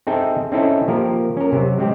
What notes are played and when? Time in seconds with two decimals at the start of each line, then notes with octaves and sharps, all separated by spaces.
0.07 C4 D#4 G#4 A4 E5 G5
0.52 C4 C#4 D#4 E4 A4
0.88 F3 A#3 G4 A#4
1.37 C#4 A#4
1.52 C3 F#3
1.78 G#3 C4 G4